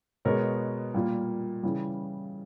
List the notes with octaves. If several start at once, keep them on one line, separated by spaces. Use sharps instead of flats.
B2 G#3 B3 A#4 C#5
A#2 G3 A#3
C#3 E3 G3